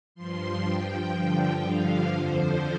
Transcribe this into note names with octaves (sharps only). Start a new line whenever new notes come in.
G2 F3 C6
G2 F3 G5
G2 D3 F3
G2 D3 F3 F5
F2 D3 F3 C5